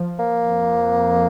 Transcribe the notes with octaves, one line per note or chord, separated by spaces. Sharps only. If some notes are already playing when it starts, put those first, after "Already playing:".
Already playing: F3
A#3
F2